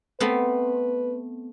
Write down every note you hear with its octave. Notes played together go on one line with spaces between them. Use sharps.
A3 B3 C4 B4